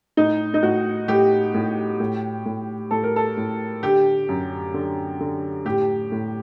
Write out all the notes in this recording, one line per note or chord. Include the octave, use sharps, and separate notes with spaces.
A2 D#4
D#4
A2 F#4
A2 G4
A2
A2
A2
A2 A4
A#4
A4
A2
D3 G4
F#2
D3
D3
A2 G4
A2